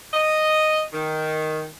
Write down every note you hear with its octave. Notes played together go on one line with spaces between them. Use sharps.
D#5
D#3